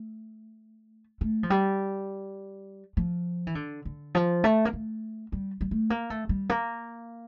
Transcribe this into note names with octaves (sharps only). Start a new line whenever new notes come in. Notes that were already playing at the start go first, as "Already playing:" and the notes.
Already playing: A3
A3
F3
G3
F3
E3
D3
D3
F3
A3
A#3
A3
G3
G3
A3
A#3
A3
G3
A#3